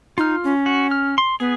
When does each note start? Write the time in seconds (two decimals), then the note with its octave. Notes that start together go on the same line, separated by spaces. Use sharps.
0.18 D#4 F4 F6
0.44 C#4
0.66 F#4
0.91 F6
1.18 C6
1.40 B3 G#4